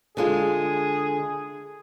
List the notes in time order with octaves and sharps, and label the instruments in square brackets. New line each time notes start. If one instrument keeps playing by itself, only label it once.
[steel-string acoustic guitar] D3 G#3 F4 [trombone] G#4